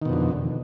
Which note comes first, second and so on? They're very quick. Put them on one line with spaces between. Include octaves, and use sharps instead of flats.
D#3 B2 F2 D3